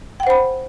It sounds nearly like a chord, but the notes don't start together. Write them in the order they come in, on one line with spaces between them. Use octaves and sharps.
G5 F#5 C5 B5